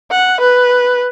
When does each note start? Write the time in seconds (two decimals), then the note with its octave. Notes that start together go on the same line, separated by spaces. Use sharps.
0.11 F#5
0.40 B4